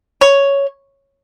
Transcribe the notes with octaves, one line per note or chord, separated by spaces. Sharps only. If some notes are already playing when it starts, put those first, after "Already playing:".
C#5